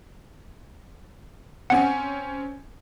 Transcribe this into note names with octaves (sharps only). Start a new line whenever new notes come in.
C4 C#4 F#5 G#5